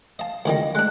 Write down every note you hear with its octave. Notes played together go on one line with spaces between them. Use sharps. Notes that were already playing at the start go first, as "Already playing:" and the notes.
D#5 F5 A5
C#2 D#3 G3 D#5
G#3 D4 F#6